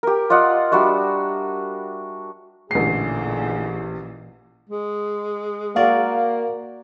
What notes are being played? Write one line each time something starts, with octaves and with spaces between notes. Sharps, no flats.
G4 A#4
F4 D5 D#5 F#5
G3 D4 F#4 E5
A1 A#2 D3 E3 G#4 C7
G#3
A#3 F#4 A#4 D5 F5